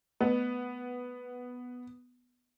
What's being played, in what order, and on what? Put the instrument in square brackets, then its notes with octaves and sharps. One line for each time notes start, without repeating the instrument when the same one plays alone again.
[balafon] A3 [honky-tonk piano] B3